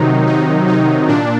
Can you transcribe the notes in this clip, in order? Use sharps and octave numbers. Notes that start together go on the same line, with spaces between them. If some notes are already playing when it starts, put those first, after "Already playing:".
Already playing: C3 D#3 F#3 D#4
D#4
D#4
A#2 D4